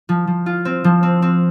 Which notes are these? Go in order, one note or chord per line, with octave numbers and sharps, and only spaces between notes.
F3
F3
F4
C4
F3
C4
C4